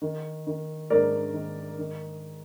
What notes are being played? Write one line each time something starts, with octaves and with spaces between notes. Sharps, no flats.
D#3
D#3
G#2 A#4 D5
D#3
D#3